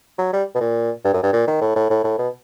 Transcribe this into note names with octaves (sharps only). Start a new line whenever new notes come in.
F#3
G3
B2
A#2
G2
F#2
G2
A#2
D#3
A2
A2
A2
A2
B2